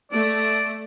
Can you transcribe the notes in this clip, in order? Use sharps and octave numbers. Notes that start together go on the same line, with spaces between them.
A3 D5